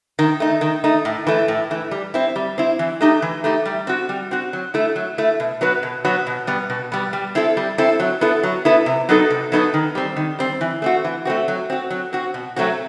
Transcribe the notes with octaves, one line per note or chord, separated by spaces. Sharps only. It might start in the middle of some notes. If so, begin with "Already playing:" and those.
D#3
A3 D#4
D#3
A3 D#4
A2
E3 A3
A2
E3 A3
G3
C4 E4
G3
C4 E4
E3
A3 D#4 G4
E3
A3 D#4 G4
G3
C4 F#4
G3
C4 F#4
F#3
A3 E4
F#3
A3 E4
B2
F#3 B3 F#4 B4
B2
F#3 B3 F#4 B4
B2
G3 B3
B2
G3 B3
G3
C4 E4 A4
G3
C4 E4 A4
F#3
B3 E4 A4
F#3
B3 E4 A4
C3
F#3 B3 D#4 A4
C3
F#3 B3 D#4 A4
D#3
G3 C4
D#3
G3 C4
E3
A3 C4 F#4
E3
A3 C4 F#4
F#3
C4 F#4
F#3
C4 F#4
B2
F#3 A3 C4 F#4